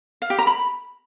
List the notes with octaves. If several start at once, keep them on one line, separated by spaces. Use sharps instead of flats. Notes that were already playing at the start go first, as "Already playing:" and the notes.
F5
G4
A#5
B5